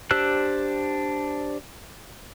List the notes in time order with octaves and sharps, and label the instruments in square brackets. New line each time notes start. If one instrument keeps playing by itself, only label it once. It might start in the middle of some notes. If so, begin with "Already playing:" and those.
[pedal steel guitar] D4 G4 C5 E6 F#6